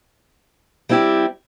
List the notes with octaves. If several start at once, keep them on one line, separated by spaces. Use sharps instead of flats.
G3 C4 E4 G4